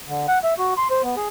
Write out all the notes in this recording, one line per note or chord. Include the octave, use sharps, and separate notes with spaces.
D3
F#5
E5
F#4
C6
C5
B3
G#4